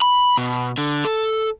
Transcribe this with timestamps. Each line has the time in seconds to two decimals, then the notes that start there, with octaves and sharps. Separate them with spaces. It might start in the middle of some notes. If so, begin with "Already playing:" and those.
0.01 B5
0.38 B2
0.78 D3
1.05 A4